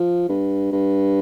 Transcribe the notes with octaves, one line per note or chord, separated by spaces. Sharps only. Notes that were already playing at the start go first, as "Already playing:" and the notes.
Already playing: F3
G2
G2